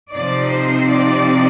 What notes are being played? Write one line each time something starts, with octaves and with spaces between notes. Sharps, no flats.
C3 F3 C4 D#4 D5
C5
D5